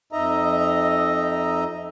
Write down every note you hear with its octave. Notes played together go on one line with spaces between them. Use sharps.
F2 D#4 D#5 E5 A#5